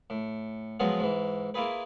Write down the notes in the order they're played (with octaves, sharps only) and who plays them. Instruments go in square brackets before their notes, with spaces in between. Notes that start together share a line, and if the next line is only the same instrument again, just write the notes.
[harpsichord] A2
F3 F#3 G#3 B3 F4 G#4
G#2 E3
A#3 E4 F4 G#4 B4